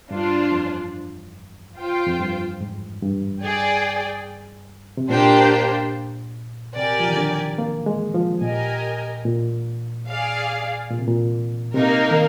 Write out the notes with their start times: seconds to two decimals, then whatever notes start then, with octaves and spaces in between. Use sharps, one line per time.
0.11 G2 D4 F4 C5
0.52 F2
1.77 F4 C5 G5
2.07 F2
2.19 G2
2.60 G#2
3.02 G2
3.43 G#4 D5 G5
4.97 C3
5.09 A#2 A#3 D4 G4 C5 G5
6.75 C3 G4 A#4 D5 G#5
7.00 F3
7.08 D#3
7.17 D3
7.58 A#3
7.86 G#3
8.14 F3
8.41 A#2 G4 A#4 D#5 G#5
9.25 A#2
10.08 G#4 D5 F5
10.90 A#2
10.99 C3
11.08 A#2
11.74 C3 A#3 D#4 A#4
12.11 D#3